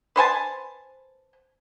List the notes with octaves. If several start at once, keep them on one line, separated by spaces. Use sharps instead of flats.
B4 C5 G#5 A5